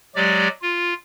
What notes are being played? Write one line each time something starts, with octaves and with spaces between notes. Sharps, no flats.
F#3 G#3 G4 D5
F4